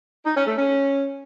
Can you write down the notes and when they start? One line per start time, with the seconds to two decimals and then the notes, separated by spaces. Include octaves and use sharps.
0.25 D#4
0.35 C#4
0.46 A3
0.56 C#4